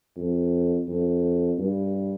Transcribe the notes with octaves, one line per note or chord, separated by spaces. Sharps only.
F2
F2
G2